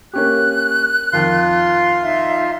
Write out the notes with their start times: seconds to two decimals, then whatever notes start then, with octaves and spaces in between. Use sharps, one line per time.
0.14 A#3 C#4 G4 F#6
1.13 F2 D#3 F4 C6
2.03 D#4 E5